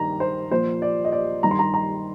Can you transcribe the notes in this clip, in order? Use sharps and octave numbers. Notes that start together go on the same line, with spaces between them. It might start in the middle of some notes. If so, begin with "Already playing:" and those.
Already playing: G2 D#3 G3 A#5
C5
A#2 F3 C5
D5
D#5
D5
G2 D#3 G3 A#5
C6
A#5
A#5